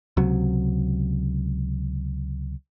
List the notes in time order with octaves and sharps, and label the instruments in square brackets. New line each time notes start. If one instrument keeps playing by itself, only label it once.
[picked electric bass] C#2 C3 F#3